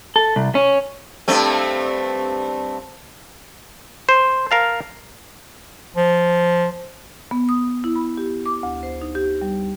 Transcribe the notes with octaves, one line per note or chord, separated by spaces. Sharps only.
A4
C2
C#4
G2 A3 C4
C5
A#4 F5 A5
F3
B3
D#6
E4
B5
G4
D6
D2
C5
D#4
G4
G3